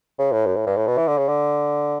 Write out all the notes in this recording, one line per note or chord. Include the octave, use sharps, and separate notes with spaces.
C#3
A2
F#2
A2
G2
A2
B2
E3
D3
C#3
D3